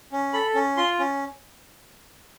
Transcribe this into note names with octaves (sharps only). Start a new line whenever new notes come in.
C#4
A4 B5
C#4
F4 C6
C#4